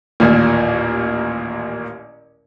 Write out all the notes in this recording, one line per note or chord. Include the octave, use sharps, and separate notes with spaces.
A1 D#2 A#2